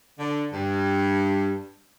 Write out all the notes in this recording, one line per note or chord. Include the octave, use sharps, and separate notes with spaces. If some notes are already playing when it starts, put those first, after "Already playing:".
D3
G2